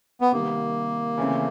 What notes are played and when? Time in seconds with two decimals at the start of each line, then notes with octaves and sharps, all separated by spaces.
0.21 B3
0.32 C3 D#3 G3 A#3
1.18 C#3 E3 A3 C4